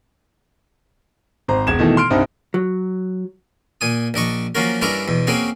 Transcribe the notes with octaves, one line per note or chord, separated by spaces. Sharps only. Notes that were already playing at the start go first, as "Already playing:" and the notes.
G#1 C5 A#5
E1 G#6 E7
B2 D#3 E3 A3
C6 F6 D7
C2 G2 C4 D#4
F#3
A#2 G#5 D#6
A#1 D4 D#5 C#6
F3 F#3 A#3 C#4 F#4 A#4
G2 C#4 D4 E4 A#4 A#5
E2 B2
A#3 C4 C#4 F#4 G#4